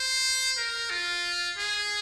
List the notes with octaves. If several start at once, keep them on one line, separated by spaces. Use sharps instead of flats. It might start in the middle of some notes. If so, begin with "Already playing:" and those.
Already playing: C5
A#4
F4
G#4